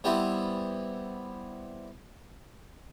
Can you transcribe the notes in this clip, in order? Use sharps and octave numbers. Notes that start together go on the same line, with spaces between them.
E3 G3 B3 C4 E4